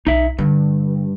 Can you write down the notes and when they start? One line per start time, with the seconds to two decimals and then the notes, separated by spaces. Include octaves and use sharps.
0.07 B1 D#4 E5
0.38 G2 D3